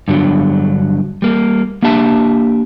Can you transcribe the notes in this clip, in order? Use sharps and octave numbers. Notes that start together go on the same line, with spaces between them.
G2 D3 F#3
G3 A#3
A#3 D4 G4 E5 A5